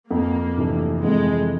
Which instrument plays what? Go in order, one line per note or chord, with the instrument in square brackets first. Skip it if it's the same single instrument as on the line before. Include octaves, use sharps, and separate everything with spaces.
[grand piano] F2 [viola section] A#3
[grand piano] C3 E3 A3 D4
[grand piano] F2 [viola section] G#3